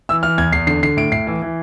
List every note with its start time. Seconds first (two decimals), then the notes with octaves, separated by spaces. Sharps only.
0.09 E3 E6
0.23 E3 F6
0.38 E2 G#6
0.52 E2 C7
0.67 D3 C7
0.83 D3 C7
0.97 A2 D7
1.12 A2 C7
1.27 E3
1.42 E3